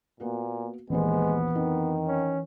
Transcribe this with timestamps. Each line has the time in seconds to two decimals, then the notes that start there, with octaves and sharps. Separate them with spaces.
0.20 A#2 A#3 B3 F#4
0.90 A#1 D#2 E3 G#3 B3 C5
1.55 F2 D#3 D#4
2.07 C#4